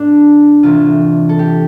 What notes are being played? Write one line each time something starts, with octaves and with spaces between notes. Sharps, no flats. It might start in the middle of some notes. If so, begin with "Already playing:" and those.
Already playing: A2 G3 C4 D4
C3 E3 A3 C4 F4
A4
G4